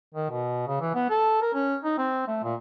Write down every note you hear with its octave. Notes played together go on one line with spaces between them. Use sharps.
D#3
B2
C#3
E3
B3
A4
A#4
C#4
D#4
C4
A3
A#2